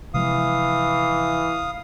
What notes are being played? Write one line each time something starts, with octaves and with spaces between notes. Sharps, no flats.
C3 E3 F3 G#3 F5 D#6